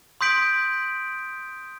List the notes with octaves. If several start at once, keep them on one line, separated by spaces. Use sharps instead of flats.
C6 D#6 G6 B6 D7 F#7